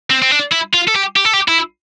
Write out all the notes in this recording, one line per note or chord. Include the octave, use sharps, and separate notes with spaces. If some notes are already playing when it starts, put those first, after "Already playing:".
C4
C4
D4
E4
F4
A4
G4
G4
A4
G4
E4